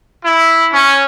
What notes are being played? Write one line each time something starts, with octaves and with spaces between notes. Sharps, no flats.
E4
C#4